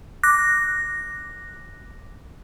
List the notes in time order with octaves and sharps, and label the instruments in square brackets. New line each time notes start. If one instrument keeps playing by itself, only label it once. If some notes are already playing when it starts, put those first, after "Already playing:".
[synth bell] D6 F#6 A#6